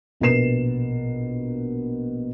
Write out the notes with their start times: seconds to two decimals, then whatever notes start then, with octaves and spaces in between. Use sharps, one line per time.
0.20 A#1 B2 A#4 B4 C7 E7